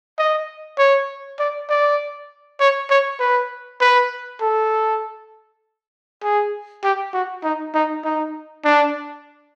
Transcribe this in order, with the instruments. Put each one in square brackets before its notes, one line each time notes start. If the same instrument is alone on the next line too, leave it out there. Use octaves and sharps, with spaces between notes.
[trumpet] D#5
C#5
D5
D5
C#5
C#5
B4
B4
A4
G#4
G4
F#4
D#4
D#4
D#4
D4